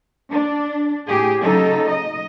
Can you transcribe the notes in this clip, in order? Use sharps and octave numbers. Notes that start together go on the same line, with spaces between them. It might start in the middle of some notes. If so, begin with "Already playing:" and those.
D4
A2 G4 G#4
C#3 F#3 D#4 A4
D#5